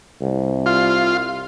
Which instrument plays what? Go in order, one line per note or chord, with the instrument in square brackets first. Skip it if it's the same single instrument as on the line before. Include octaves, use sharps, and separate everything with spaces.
[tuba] C2
[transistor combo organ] F4